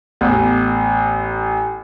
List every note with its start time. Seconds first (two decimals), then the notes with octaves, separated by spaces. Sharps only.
0.21 A1 B3